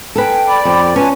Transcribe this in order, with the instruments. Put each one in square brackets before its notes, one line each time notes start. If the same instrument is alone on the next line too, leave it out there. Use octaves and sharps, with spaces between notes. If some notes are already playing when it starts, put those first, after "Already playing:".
[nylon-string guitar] A4 B4 [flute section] G5 [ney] G#5
[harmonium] D5 [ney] B5
[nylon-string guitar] F2
[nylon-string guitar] C#4 [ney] F4 [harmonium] B4 G#5 [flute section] A5